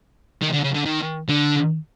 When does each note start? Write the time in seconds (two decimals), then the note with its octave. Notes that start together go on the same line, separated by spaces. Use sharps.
0.42 D#3
0.53 D3
0.64 C#3
0.74 D3
0.85 D#3
1.29 D3